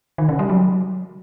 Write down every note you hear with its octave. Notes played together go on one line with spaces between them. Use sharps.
D#3
C#3
G3
F#3